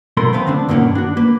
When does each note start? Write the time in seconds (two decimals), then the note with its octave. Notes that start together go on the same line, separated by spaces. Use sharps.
0.17 B1 B2 A3 B3 A#4 C6
0.33 A3 B3 C4 F5
0.47 D3 C4 D4
0.69 G2 B2 D#3 A#3 C#4 F#5
0.95 D4 F#4
1.17 A#3 B4